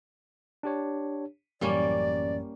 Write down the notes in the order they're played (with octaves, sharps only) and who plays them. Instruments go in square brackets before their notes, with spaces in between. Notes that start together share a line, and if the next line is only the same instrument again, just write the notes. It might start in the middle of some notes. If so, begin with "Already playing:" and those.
[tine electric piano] D4 G4 C#5
[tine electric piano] A1 F#2 [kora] G3 A#3 C#4 [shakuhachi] D5